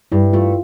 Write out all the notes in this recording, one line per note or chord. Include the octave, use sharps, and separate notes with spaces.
G2 E4
A3 F4